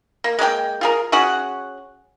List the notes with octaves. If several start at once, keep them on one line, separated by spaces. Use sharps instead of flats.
A#3
G#3 A#3 G4 G5
F4 G#4 A#4
C#4 F#4 G#4 F#5